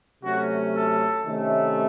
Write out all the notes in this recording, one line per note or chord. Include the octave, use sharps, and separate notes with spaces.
C3 F#3 A3 C#4 F#4
A4
C3 D#3 A3 C#4